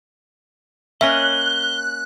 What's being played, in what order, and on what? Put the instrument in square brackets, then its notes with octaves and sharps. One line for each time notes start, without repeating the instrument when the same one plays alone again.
[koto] A#3 C#4 D#5 [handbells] E5 [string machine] F#6 [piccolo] G7